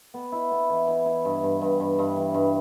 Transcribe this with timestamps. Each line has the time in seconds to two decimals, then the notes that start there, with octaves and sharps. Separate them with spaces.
0.14 B3
0.32 E4
0.51 B3
0.70 E3
0.87 E3
1.06 E4
1.25 G2
1.43 G2
1.61 G2
1.80 G2
1.99 G2
2.16 E3
2.34 G2